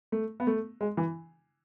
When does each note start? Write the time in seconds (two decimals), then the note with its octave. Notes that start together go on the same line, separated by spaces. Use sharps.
0.12 A3
0.40 B3
0.47 A3
0.81 G#3
0.97 E3